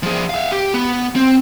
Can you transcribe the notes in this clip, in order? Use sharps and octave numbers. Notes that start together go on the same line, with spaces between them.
F3 G#4
E5 F5
G4
B3
C4